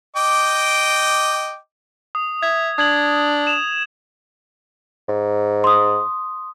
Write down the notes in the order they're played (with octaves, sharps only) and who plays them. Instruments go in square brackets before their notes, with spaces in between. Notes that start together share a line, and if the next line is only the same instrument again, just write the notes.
[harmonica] D#5 G5 D6
[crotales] D#6
[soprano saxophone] E5 [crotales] G#6
[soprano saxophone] D4 [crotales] D#6 G#6 F#7
[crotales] E7 F7
[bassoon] G#2
[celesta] C6 D#6